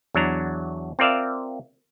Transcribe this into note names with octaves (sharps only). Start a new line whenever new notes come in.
E2 F#3 D4 A#5
C4 F4 A#4 D5 E5 F5